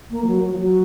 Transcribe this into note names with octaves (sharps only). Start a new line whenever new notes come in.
A#3
F3
F#3
F#3
F3
F#3